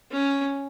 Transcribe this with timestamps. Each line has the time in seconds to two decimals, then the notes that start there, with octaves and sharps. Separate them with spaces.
0.12 C#4